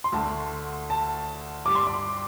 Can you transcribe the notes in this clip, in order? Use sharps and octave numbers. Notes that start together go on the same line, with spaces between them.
C6
D2 D3 A3 A5
A5
G2 G3 D6
C6
D6